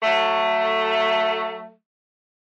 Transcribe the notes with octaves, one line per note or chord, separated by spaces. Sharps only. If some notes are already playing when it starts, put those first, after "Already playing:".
F#3 A3